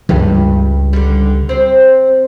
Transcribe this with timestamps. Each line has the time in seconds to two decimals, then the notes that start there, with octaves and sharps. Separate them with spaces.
0.09 C#2 G2 G3
0.93 D3 G3
1.49 C4 C5